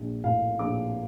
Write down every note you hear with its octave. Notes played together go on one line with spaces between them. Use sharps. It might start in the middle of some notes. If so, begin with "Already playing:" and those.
Already playing: A#1 F3
A2 F5
A#1 D6